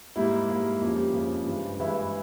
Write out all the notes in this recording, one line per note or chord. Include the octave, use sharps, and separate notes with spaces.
G#2 G3 A#3 E4
G#2 G3 A#3
F2 C#3 F3 A#3 E4
G3 G4
F2 C#3 F3 A#3
G2 E3 G#3
G2 E3 G#3 E4 E5